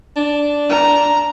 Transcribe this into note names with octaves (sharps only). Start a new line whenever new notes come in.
D4
A#5